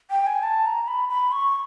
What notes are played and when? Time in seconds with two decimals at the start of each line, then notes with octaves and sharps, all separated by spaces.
0.10 G5
0.27 G#5
0.43 A5
0.66 A#5
0.87 B5
1.09 B5
1.32 C#6